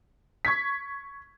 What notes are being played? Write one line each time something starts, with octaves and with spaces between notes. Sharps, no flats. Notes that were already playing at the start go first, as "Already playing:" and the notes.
C#6 G#6 B6